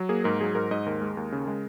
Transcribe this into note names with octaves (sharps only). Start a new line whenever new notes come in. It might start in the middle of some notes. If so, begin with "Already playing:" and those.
Already playing: F#3
A#3 G#4
G#2 A#4
F#3 G#4
G#2 A#4
G#2 D#5
D#2 A#4
G#3
D#2
C#3
G#3